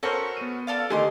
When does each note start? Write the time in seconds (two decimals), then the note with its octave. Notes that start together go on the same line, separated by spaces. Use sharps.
0.03 C#4 F#4 A4 A#4 C5 C#6
0.37 B3 D#7
0.67 A4 D5 F5
0.90 D3 D#3 A3 G4 G#4 D#5 C6 D6